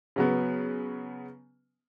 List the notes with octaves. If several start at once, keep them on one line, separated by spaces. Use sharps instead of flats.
C#3 F#3 B3